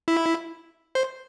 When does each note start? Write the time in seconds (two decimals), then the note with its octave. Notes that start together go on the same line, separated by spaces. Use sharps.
0.08 E4
0.95 C5